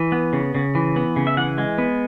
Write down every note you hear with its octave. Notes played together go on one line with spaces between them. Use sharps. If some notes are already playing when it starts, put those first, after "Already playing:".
Already playing: E3
B3
C#3
C#3
E3
B3
C#3
E5
E3 F#5
G#3
B3